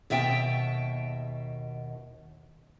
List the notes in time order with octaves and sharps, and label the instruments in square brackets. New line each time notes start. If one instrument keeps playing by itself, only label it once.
[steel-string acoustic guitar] D#2 B2 E5 G5 A5